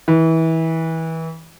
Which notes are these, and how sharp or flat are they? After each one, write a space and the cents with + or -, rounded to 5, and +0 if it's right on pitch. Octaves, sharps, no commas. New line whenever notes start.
E3 -25